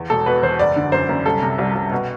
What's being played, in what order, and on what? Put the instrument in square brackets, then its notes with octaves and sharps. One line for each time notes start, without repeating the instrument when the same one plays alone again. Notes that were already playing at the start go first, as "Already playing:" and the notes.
Already playing: [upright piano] E2
E1 A4
B2 B4
E2 C5
F#1 D5
D3
F#2 C5
F#2
C2 A4
C3
C2
C2
B2